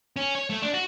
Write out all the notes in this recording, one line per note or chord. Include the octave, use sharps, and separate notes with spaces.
C#4
C#5
A3
D4
F#4